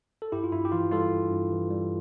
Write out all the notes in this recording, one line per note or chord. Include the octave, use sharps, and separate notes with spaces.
A4
G2 E4 G4
F4
G2 E4
G4
E3 F4
G3 F4 A4
G2
G2
E3
G3